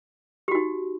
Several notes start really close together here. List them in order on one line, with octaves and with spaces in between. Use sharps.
G4 F#4 D#4